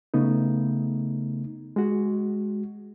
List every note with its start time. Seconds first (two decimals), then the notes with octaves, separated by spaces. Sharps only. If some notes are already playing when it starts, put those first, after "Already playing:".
0.14 C#3 A3 B3 D#4
1.76 G#3 F#4